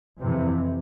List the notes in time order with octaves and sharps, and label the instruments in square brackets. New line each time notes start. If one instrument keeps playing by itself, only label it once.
[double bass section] F2 C3 E3